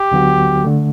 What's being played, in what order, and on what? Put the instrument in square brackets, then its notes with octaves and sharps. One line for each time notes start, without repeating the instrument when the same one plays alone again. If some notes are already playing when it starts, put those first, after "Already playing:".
Already playing: [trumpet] G4
[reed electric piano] D2 D3 F#3 B3 F#4
D3 A3